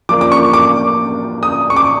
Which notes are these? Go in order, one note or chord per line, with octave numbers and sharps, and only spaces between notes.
F3 A#3 D4 F4 D6
D6
C#6
D6
D#6
C#6
D6